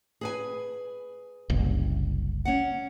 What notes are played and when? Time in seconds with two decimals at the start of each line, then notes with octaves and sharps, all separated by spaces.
0.21 G#4 B4 G#5
1.50 F#1 C2
2.45 C#4 F#5